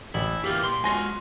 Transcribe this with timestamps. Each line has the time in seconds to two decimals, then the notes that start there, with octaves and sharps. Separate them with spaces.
0.14 A1 E4
0.44 E3 A#3 F4 G4
0.61 A#2 C6
0.84 G#3 F4 F#4 G#5 C6 A#6